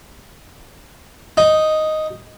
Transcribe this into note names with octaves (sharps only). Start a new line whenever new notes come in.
D#4